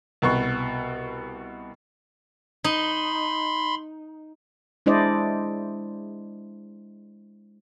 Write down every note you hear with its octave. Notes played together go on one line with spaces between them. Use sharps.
C2 B2 C#6
D#4 B5 C6
G#3 D4 E4 C5 D5 D#5